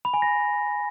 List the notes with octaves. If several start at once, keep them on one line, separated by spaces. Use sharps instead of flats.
B5
G#5
A#6